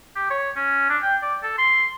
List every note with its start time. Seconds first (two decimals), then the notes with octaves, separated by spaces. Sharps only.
0.16 G4
0.30 C#5
0.56 C#4
0.89 D4
1.02 G5
1.22 D5
1.43 A4
1.58 C6